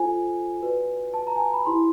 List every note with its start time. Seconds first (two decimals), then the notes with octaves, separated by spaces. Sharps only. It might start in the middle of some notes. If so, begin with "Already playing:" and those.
Already playing: F4 A4 C5 G#5
0.61 F#4 B4 D5
1.14 A5
1.27 A#5
1.36 G#5
1.40 A5
1.53 B5
1.66 E4 G4 C5 C6